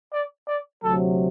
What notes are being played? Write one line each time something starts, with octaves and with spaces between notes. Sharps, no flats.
D5
D5
D2 C3 F#3 A4